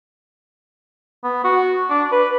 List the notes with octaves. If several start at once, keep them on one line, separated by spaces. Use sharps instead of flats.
B3
F#4
D4
B4